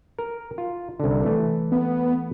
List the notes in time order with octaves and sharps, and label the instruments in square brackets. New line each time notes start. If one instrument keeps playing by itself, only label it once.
[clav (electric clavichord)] A#4
F4
C2 D3
E3 A3
[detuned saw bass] B3